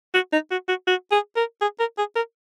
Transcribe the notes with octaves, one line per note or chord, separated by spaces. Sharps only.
F#4
D#4
F#4
F#4
F#4
G#4
A#4
G#4
A#4
G#4
A#4